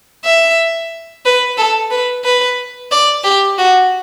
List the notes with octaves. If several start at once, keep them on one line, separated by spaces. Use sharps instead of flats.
E5
B4
A4
B4
B4
D5
G4
F#4